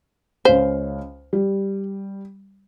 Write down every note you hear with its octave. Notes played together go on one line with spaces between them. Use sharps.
C#2 C#4 C5 F5
G3